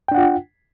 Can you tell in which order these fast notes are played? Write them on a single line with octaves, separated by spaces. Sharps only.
G5 D4 F#5 F4